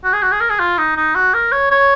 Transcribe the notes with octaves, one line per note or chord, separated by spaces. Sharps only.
F#4
G#4
F#4
G#4
A#4
G#4
F4
D#4
D#4
F#4
A#4
C#5
C#5